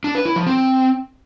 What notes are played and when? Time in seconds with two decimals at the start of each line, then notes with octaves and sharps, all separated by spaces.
0.04 D4
0.15 B4
0.25 E4
0.36 F3
0.47 C4